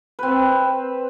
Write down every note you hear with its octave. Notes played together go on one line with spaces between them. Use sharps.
C4 B4